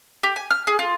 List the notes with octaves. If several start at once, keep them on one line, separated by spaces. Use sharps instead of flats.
G4
G#5
F6
G#4
F4